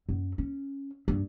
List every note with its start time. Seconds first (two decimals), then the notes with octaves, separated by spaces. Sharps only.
0.09 F#2
0.38 C#4
1.08 G2